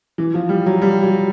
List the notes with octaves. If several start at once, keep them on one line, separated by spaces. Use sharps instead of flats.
E3
F3
G3
F#3
G3
F#3